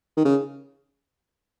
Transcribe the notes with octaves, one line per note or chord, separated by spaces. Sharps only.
D#3
C#3